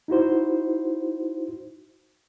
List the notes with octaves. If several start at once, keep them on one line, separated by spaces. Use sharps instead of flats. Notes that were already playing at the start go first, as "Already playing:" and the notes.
D#4 E4 F#4 C5